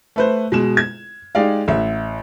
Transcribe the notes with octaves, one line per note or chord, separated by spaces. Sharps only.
A3 B4 C5
B2 G#3 E7
G#6
G#3 D#4 G4 D5 F5
A1 E5